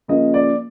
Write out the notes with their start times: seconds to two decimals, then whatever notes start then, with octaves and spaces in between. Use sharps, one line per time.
0.08 C#3 F3 A#3 D#5
0.34 D5